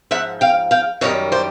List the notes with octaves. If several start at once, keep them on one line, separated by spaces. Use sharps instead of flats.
G#2 F3 E5 F#5
F5 G5
F5 G5
F#2 D#3 G3 C#5 D#5
C5 D5